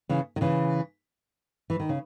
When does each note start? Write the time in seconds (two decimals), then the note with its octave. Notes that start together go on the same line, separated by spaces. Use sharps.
0.09 C#3 E3
0.36 D#3
0.41 C#3 E3
1.70 E3
1.80 D#3
1.89 C#3